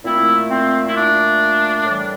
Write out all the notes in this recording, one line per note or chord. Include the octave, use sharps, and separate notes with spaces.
A#2 A3 C4 E4
C4
E4
D4
A2 E3 G3